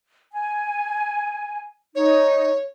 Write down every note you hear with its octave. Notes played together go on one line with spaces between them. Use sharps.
G#5
D#4 C#5